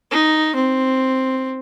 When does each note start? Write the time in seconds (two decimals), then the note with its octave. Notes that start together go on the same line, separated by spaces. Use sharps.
0.11 D#4
0.55 C4